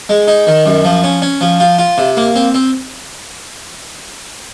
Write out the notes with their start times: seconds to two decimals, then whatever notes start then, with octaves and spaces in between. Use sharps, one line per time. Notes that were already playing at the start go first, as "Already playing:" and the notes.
0.09 G#3
0.28 D#4
0.47 D#3
0.66 F#2
0.84 F3
1.04 C#4
1.22 C#4
1.41 F3
1.60 F4
1.79 F4
1.98 C3
2.17 A#3
2.36 C4
2.54 C4